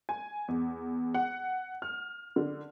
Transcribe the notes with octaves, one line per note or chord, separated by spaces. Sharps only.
G#5
E2
F#5
F6
D3